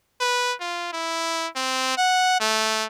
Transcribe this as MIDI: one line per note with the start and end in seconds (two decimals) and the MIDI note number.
0.20 0.54 71
0.60 0.89 65
0.93 1.47 64
1.56 1.97 60
1.98 2.37 78
2.40 2.86 57